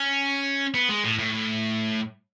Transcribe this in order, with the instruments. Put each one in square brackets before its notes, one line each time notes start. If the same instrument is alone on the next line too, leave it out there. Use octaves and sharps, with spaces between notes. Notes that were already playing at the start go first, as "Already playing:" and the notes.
Already playing: [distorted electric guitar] C#4
B3
G#3
A2
A2